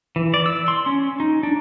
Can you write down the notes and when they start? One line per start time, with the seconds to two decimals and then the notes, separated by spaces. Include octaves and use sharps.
0.16 E3
0.34 D5
0.46 E6
0.68 C6
0.86 C#4
1.20 D#4
1.43 D4